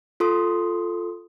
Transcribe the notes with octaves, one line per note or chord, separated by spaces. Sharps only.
F4 A4 C6 D#6